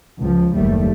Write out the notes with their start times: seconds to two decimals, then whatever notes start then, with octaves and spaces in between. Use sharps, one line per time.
0.20 C#2 F3
0.56 F#1 D#2 G3 A3